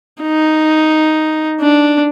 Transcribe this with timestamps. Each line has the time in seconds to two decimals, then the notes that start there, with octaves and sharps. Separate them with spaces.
0.22 D#4
1.61 D4